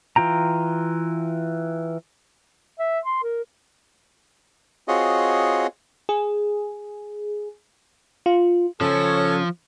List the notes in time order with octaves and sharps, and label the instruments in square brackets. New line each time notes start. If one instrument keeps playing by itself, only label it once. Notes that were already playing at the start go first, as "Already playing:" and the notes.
[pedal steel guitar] E3 F4 G5 A#5
[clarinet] E5
C6
A#4
[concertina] C4 F4 F#4 G#4 C#5 D#5
[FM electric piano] G#4
F4
[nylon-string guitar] C#3 C#4 [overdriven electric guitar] F3 [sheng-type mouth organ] A4 [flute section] C#5